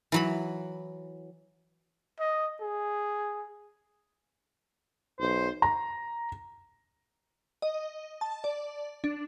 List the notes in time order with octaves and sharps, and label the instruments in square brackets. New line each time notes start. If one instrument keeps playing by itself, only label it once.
[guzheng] E3 F#3 B5
[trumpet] D#5
G#4
[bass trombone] B1 [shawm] C5
[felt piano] A#5
[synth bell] D#5
A5
D5
D4